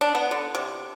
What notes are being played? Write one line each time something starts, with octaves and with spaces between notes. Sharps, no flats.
D4
B3
D3
C3